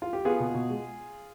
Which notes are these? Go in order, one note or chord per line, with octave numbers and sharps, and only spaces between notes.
F4
G4
B3 F4 G#4
B2
B2
G#3